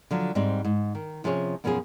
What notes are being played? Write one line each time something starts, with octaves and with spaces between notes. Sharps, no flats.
D3 F3 F#3
G#2 G3 G#3 C4
G#2
D#3
C3 F3 C#4 G#4 C5 C#5
F#2 B2 F3 C#4 F4 G#4